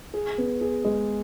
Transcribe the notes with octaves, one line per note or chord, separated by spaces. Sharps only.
G#4
B3
G#4
G#3